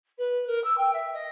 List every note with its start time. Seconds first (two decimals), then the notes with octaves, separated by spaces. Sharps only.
0.18 B4
0.47 A#4
0.64 E6
0.77 G5
0.93 E5
1.13 D#5